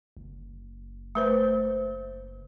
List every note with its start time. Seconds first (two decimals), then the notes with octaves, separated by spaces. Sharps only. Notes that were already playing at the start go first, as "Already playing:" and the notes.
0.17 F#1
1.15 A3 B4 C5